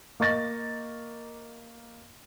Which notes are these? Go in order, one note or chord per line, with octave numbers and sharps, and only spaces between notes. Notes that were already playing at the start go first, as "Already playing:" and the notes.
A#3 D#5 C#6 A6 A#6